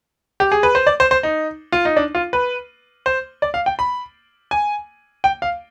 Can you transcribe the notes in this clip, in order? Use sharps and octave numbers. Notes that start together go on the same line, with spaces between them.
G4
G#4
B4
C5
D5
C5
C5
D#4
F4
D#4
D4
F4
B4
C5
D5
F5
G5
B5
G#5
G5
F5